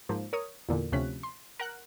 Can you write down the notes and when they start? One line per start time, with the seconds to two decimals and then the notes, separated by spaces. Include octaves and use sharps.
0.09 G#2 F3 A#3
0.33 A#4 C#5 D#6
0.69 E2 A#2 D3
0.92 D2 C3 F3 C#4 F#6 B6
1.23 C6
1.59 A#4 F#5 F#6